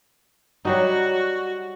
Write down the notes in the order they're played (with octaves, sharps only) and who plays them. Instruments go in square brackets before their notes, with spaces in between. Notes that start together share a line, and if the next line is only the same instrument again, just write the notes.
[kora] F#3 G3 D#4 [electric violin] F#4